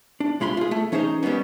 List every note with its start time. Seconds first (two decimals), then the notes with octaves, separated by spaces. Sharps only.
0.20 D4
0.40 C2 G#3 F4 B5 C6
0.57 F4 G#4
0.71 A3
0.92 E3 C#4 D#4 G#4 C5 A#5
1.23 G3 G#3 A#3 B3 C#4